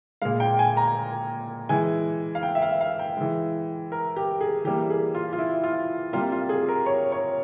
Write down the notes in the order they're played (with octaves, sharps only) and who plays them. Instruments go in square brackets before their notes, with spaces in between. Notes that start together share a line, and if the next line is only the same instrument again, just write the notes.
[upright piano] A#2 G#3 F5
G5
G#5
A#5
E3 G#3 G#5
F5
G5
E5
F5
F5
G5
E3 G#3
A#4
G4
G#4
E3 G3 A#3 G4
G#4
F4
F4
E4
F4
C3 G3 A#3 F4
F4
G#4
A#4
C#5
C#5